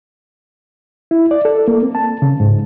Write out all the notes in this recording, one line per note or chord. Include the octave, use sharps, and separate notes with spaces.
E4
D5
A4
A#3
C4
A5
C#3
G#2